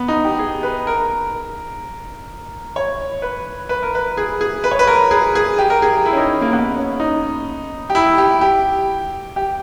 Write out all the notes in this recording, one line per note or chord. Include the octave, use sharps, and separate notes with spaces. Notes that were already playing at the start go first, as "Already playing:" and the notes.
Already playing: B3
D#4
G4
G#4
B4
A#4
C#5
B4
B4
A#4
B4
G#4
G#4
B4
C#5
B4
A#4
G#4
G#4
G4
A#4
G#4
E4
C#4
D#4
A#3
B3
C#4
D#4
G4
E4
G4
G4
G4